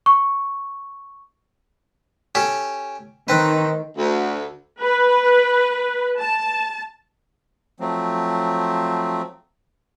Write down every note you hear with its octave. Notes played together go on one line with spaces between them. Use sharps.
C#6
C#4 G4 A4
D#3 C4 B4
D2
B4
A5
F3 F#3 A3 C4